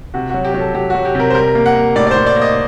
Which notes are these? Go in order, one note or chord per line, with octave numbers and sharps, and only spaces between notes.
C3 F#4
F#3 F#4
G4
F#3
A4
F#3 G4
F#3 F#4
G4
C3 A#4
C5
G3 A#4
A#3
F#5
A#3
A2 D5
D5
A2 C5
D5
A#3
D#5